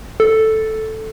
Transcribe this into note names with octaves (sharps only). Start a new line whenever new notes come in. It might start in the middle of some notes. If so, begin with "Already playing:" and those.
A4